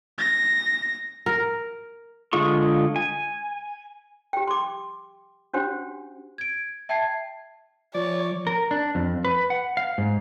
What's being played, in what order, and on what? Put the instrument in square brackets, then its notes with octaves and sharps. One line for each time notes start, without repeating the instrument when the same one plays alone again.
[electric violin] A#6
[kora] A#4
[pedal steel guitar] D3 G#3 F4 G#4 C#6
G#5
[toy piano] G4 G5
C6 D6
C#4 D4 F#4 G4 C5 F#5
[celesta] G#6 D7
E5 G5 A5 G#6 C7
[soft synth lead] F3 [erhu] C#5 [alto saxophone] D5
[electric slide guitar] A#4
D4
F2
B4
F#5
F5
G#2